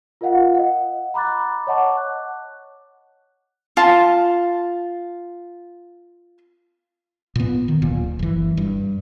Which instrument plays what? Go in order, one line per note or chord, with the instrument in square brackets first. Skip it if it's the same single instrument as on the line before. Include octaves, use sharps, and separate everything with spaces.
[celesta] F4 A#4 D#5 F5 F#5
D#5 F#5
A#5 B5 D6 F#6 A6
C#5 D#5 F#5 A5 C#6 D6
F#6
[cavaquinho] F4 A5
[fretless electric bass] A#2 B3
D#3
D1 A#2
F#1 E3
G2